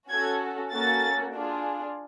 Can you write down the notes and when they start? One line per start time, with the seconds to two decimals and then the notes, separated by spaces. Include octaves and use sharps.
0.10 C#4 F#4 A4 G#6
0.72 A#3 C#4 F#4 A4 A6
1.34 D4 F4 G#4